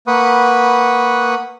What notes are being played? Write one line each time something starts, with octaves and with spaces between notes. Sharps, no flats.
A#3 B4 F#5 B5 C#6 D#6